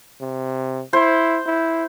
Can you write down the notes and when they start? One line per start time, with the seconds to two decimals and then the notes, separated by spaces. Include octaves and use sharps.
0.21 C3
0.93 E4 C5
1.46 E4